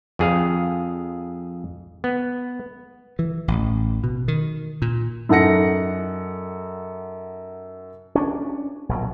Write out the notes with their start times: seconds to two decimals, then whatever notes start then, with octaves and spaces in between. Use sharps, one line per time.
0.19 F2 G#4 F5
2.04 B3
3.19 E3
3.48 A1
4.04 B2
4.28 D#3
4.82 A#2
5.29 F#2 D#4 A4 F#5 A#6 C#7
8.15 C#4 D4
8.89 A#1 B2 F#3